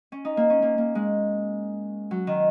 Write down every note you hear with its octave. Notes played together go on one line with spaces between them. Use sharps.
C#4
D#4
A#3
C#4
A#3
A#3
G#3
F#3
D#3